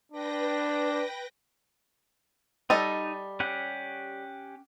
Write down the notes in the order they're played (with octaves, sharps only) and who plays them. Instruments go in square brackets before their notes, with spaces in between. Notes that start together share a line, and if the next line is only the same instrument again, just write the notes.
[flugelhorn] D4 [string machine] B4 G5 A#6
[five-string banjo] G3 A4 D#5 [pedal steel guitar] D#4
[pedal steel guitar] C#4 G4 F#5